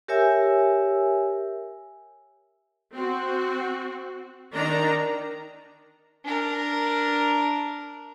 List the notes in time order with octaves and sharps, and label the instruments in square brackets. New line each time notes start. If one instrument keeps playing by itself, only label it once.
[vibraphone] G4 A#4 C#5 E5 G#5 E6
[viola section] C4 F#4
D#3 D4 D#4 A#5
[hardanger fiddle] D4 A#4